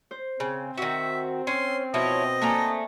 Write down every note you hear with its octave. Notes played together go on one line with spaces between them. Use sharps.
C5
C#3 C4
D#3 F#4 E5
C#4 C6
B2 F3 E4 C#5 D#5
A3 A#3 D4 G#5 A#5